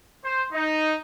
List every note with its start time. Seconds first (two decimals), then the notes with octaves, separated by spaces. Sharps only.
0.22 C5
0.52 D#4